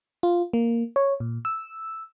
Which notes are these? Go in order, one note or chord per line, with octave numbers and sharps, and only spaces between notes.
F4
A#3
C#5
A#2
E6